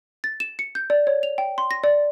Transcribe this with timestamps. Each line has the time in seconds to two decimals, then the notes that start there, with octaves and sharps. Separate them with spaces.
0.24 A6
0.40 E7
0.59 C#7
0.75 G6
0.90 D5
1.07 C#5
1.23 F7
1.38 G5
1.58 C6
1.71 A#6
1.84 D5